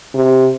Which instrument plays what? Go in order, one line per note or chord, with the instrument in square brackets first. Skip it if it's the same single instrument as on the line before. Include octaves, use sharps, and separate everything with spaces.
[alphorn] C3